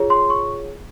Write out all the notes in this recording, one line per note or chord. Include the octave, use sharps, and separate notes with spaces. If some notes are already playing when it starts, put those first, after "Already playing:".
Already playing: F4 G#4 C#5
C6
C#6